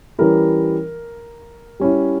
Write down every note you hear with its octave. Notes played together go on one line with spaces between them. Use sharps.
E3 G3 C#4 E4 A#4
G3 C#4 E4